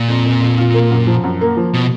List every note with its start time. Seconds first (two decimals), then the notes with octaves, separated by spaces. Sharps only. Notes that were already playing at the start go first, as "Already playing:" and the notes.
Already playing: A#2
0.08 F2
0.25 F2
0.41 F2
0.58 F4
0.74 A#3
0.91 F#2
1.07 F3
1.23 F#2
1.41 A#3
1.57 F3
1.74 B2